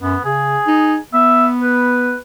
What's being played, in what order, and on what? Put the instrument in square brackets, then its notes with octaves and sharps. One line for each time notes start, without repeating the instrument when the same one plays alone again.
[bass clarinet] F#2 [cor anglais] B3
[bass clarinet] C#3 [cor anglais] G#4
[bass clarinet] D#4
[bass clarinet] B3 [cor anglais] E5
[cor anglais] B4